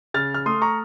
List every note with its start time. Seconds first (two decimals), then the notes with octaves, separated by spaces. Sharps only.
0.14 C#3 F6 A6
0.34 F6
0.46 A3 C6 D#6
0.62 A#5 C#6